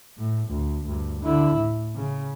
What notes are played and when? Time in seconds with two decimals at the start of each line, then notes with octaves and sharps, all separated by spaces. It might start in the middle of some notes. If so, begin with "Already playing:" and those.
0.17 A2
0.49 D2
0.86 D2 G2
1.22 D3 E4
1.56 A2
1.96 C#3